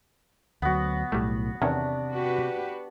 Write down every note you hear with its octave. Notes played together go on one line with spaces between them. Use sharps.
D2 F#3 B3 F#4
B1 A2 G3 A3
E2 C3 D#3 C#4 D4
F#4 G4 B4